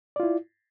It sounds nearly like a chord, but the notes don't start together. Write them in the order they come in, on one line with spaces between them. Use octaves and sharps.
D5 F4 E4